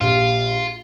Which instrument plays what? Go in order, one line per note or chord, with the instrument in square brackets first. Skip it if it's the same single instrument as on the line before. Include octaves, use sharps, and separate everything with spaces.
[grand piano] A#1 G4 [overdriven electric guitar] F4